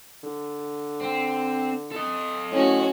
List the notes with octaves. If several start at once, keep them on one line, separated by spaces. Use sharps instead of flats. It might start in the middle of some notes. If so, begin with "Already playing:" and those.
D3
C4
A4 D#5
A2 C#4 F#4